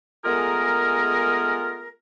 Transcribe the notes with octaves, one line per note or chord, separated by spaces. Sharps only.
G#3 A3 B3 F4 G#4 A#4